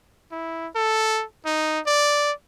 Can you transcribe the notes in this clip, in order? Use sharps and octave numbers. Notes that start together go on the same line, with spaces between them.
E4
A4
D#4
D5